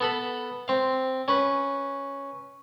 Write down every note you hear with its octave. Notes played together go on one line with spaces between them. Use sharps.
B3 A4 B5
C4 F5
C#4 B4